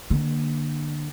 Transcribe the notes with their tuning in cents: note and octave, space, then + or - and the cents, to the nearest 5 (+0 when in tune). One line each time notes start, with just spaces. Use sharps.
D3 +20 A#3 +0